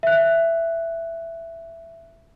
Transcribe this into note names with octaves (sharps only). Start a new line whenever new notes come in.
E5 F#6